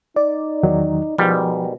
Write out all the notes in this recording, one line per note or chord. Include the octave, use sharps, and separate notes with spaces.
D#4 D5
E2 D#3 F#3
G#2 B2 D#3 F3 G3